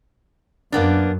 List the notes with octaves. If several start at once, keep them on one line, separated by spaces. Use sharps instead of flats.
F#2 A#3 B3 D4